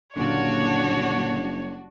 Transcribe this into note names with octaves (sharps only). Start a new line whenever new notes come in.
F#1 A#2 D3 G3 D4 F#4 C#5